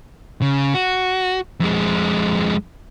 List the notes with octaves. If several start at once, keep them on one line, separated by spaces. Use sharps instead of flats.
C#3
F#4
F2 G#3